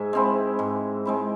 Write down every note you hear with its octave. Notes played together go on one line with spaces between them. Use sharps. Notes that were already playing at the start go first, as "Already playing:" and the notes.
Already playing: G#2 E5 G#5
G#3 C4 E4
G#2
G#3 C4 E4